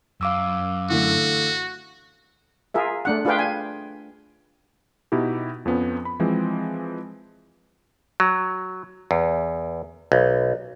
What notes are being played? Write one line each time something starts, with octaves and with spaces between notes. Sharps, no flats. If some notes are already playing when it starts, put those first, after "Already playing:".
F#2 F5 D6 E6
D3 E3 A3 F#4
F4 G#4 A#4 E5
A3 D4 F#5
D4 F4 G#4 B4 F5 G5
G#5
B2 D#4 E4 G4
F2 F3 B3 C#4
B5
E3 F3 G#3 C4
F#3
E2
B1